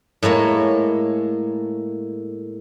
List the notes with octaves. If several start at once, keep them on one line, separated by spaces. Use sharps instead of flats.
A2 G#3 A#3 C#5